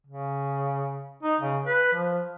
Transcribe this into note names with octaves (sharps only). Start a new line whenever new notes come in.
C#3
D#4
C#3
B4
F3